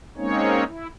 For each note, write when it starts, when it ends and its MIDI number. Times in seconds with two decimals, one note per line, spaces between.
0.17 0.64 56
0.17 0.64 58
0.17 0.64 60
0.17 0.64 61
0.17 0.64 63
0.17 0.64 73
0.67 0.87 64